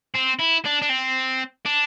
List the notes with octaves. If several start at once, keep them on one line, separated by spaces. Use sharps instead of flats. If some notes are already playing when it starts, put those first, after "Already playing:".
C4
E4
D4
D4
C4
D4